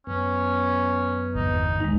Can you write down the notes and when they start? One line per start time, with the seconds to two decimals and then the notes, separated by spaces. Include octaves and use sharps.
0.07 F#2 B3 C#4
1.35 G1 E2 D#4
1.80 D1 D#2 G#3 D#4